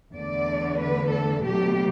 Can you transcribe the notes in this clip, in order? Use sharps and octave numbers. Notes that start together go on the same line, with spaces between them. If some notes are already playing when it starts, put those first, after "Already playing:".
E2 D3 A3 D5
B4
A4
B2 F#3 A3 G4